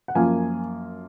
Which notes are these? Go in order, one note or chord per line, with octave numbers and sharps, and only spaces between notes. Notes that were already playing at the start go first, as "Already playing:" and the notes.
F#5
F#2 F3 A#3 F4 G#5